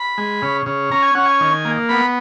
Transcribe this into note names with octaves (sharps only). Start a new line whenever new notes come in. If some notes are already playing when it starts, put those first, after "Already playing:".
Already playing: B5
G#3
C#3
C#3
C#4 A#5
G#5
C#4 F#5
G#5
D#3
A#3
B3 B5